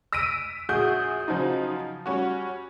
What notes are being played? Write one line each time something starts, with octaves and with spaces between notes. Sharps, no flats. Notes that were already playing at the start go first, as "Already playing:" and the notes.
E6 A#6 B6 D7 D#7
A#1 F#4 G#4 D#6 G6
C#3 F3 F#3 D#4 F4
G3 C#4 F#4